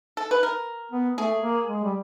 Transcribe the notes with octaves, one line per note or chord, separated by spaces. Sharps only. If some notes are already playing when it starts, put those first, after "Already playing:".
A4
B4
A#4
B3
A3 G#4
A#3
G#3
G3